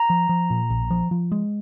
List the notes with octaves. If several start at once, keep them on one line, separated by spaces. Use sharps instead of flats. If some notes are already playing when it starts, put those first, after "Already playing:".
Already playing: A#5
F3
F3
A#2
A#1
F3
F3
G#3